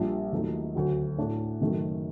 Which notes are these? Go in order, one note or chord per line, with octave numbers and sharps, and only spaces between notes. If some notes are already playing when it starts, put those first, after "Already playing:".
Already playing: A#1 A#2 G3 D4
D#2 D#3 F#3 A3 D#4
D2 D3 F#3
A2 A3 D4
F#1 F#2 D#3 A3